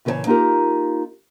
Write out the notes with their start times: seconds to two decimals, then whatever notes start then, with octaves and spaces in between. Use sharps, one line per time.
0.05 A#2 C#3 E3 A#4 C#5 A5
0.26 A#3 D#4 F4 G4 A#4